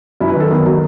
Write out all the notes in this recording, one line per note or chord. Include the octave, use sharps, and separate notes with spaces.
F#2 E4
B4
D#3 A4
D#3 B3
F#3